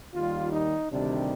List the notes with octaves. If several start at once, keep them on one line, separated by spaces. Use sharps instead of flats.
D#2 D#3 G3 F4
D#4
D2 C3 D#3 G3 D4